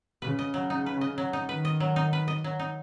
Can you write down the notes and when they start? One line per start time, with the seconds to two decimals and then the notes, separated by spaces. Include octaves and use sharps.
0.22 C#3 B4
0.39 D#5
0.54 F#3
0.70 D#4
0.86 B4
1.01 D#5
1.18 F#3
1.33 D#4
1.49 D#3 B4
1.65 D#5
1.80 F#3
1.96 D#4
2.13 B4
2.28 D#5
2.44 F#3
2.60 D#4